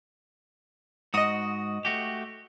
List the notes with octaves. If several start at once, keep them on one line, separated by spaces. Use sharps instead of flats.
G#2 F#4 D#5 D#6
A3 F#4 G4